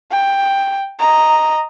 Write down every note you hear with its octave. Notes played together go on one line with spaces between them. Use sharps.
G5
D#5 A#5